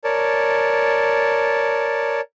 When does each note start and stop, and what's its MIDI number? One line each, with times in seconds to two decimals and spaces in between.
0.04 2.21 70
0.04 2.21 73
0.04 2.21 74
0.04 2.21 81